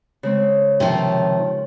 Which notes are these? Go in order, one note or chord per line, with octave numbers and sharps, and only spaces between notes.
C#3 G#3 C4
C3 D#3 F3 C#4